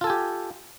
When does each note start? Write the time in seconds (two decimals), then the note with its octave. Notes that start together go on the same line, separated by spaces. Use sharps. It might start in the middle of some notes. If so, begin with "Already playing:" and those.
0.01 F4
0.04 A4
0.07 G#5
0.10 G4